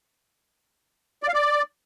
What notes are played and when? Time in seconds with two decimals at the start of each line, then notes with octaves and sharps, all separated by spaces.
1.23 D5
1.28 F5
1.34 D5